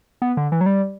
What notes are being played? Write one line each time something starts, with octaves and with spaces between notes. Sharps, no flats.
B3
D3
E3
F#3
G3